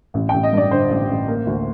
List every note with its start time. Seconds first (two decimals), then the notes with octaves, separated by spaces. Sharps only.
0.14 A1
0.29 A1 G5
0.43 D#5
0.53 G2 D5
0.71 D3 C5
0.90 A1
1.08 A1
1.28 A#3
1.47 D2